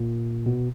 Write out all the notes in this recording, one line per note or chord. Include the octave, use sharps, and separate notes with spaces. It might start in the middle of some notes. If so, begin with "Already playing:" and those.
Already playing: A#2
B2